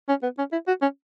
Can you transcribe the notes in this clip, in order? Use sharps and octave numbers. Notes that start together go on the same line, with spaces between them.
C#4
B3
C#4
E4
F#4
C#4